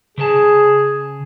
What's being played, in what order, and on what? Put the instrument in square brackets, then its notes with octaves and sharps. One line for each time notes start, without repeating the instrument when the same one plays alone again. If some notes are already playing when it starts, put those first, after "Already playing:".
[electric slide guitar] C#3 B4 A5 [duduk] G#4